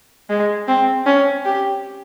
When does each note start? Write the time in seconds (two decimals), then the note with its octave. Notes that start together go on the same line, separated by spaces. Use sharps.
0.30 G#3
0.68 C4
1.07 C#4
1.46 G4